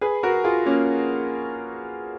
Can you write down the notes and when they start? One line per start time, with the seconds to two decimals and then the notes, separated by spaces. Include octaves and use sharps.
0.01 G#4 B4
0.23 F#4 A#4
0.44 F4 G#4
0.66 A#3 C#4